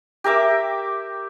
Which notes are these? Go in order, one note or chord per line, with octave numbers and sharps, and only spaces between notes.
G4 A#4 E5 D6